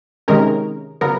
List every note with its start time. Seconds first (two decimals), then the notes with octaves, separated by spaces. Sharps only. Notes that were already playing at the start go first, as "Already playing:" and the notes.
0.28 C3 D#3 G#3 C#4 A#4
1.01 C#3 F#3 B3 A#4